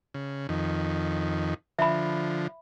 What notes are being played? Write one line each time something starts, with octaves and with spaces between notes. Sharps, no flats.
C#3
F2 D#3
D3 F3 E5 B5